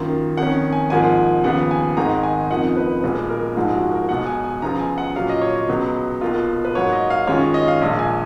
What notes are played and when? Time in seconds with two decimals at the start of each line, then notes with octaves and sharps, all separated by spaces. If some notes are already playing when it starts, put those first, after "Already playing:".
Already playing: F#2 D#3 A#3 F4
0.37 F2 D#3 A#3 C#4 F#5
0.73 G#5
0.90 G#1 G#2 F3 A#3 G#5
1.44 D#2 C#3 F3 B3 F#5
1.71 G#5
1.97 G#1 G#2 D#3 G#3 A#5
2.23 G#5
2.50 F#1 F2 F3 A#3 D#4 F#5
2.77 B4
3.03 B1 A#2 G#3 B4
3.29 A#4
3.56 A#1 G#2 F3 G#3 D#4
3.74 F#4
3.91 A#4
4.09 B1 B2 G#3 F#5
4.26 G#5
4.44 G#5
4.62 C#2 C#3 F3 B3 F4 A#5
4.80 G#5
4.98 F#5
5.16 A#2 F#3 C#4 F4 F5
5.29 D#5
5.41 C#5
5.56 D#5
5.69 C#2 B2 F#3 B3
6.21 B1 B2 A#3 F4
6.65 B4
6.74 G#2 F#3 A#3 C#5
6.92 D#5
7.10 F5
7.27 F#2 D#3 G#3 C#4 F4 C#5
7.54 D#5
7.68 F5
7.81 A#1 A#2 G#3
7.99 G#5